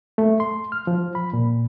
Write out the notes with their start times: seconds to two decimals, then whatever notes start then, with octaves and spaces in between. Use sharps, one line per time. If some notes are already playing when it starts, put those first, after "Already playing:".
0.18 A3
0.40 C6
0.72 F6
0.87 F3
1.15 B5
1.33 A#2